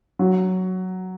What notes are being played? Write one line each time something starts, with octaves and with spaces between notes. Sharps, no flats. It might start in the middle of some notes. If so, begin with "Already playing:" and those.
F#3